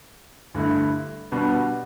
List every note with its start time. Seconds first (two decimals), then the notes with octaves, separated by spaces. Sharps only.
0.55 G2 D3 A3 E4
1.32 B2 G3 B3 D4